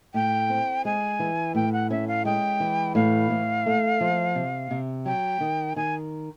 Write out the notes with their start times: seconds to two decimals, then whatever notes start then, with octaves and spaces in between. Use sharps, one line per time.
0.14 A2 G5
0.50 C4
0.85 G#3 G#5
1.20 E3
1.55 A2 G5
1.73 F#5
1.90 C#4 E5
2.08 F5
2.25 G#3 G5
2.60 E3
2.95 A2 F5
3.30 A2
3.66 A3
4.01 F3
4.35 C3
4.71 C3
5.06 F#3 G5
5.41 D#3
5.76 D#3 G#5